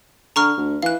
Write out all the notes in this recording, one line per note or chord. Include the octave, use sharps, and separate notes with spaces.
D3 A#5 C#6 F6
D2
E3 F5 F#6